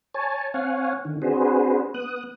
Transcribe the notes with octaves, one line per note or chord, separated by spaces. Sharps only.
C#5 G#5 A5
C4 C#5 F5 F#5 G#5
D3 D#3
C4 D4 F#4 G#4 B4 C5
B3 D#6 F#6